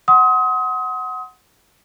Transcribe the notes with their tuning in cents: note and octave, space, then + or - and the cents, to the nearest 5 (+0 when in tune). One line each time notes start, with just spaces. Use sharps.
F#5 +0 C6 +0 D#6 +30